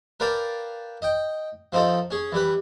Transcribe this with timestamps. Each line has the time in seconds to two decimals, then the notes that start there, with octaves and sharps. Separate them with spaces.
0.20 A#4 B4 D5 F5 G5 A5
1.02 D#5 G5
1.72 F3 C4 D#4 F4 A4
2.11 C#4 G#4
2.32 E3 G3 B4